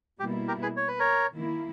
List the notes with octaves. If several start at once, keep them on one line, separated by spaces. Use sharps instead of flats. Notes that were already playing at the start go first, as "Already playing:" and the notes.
B2 G3 A#3 E4 G4
G4 A#4
G#4 B4
C#5
B4
A#4 C#5
D#3 A#3 E4